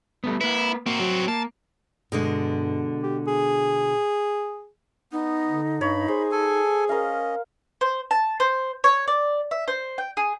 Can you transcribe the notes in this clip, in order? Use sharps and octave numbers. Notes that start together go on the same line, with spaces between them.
G3 A3 B3
A#3 E4 B4
A#3 C4 F#4
F#3
A#3 A5
G2 B2 D3 G#3
G4
G#4
B3 D#4
D3
G2 C#5 B5
G#4 C5
A4 G#5
C#4 A#4 D#5 F5
C5
A5
C5
C#5
D5
E5
C5
G5
G#4